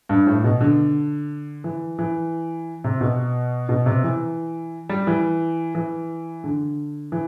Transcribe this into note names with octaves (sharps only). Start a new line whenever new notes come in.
G2
A2
B2
D3
E3
E3
C3
B2
B2
C3
E3
G3
E3
E3
D3
E3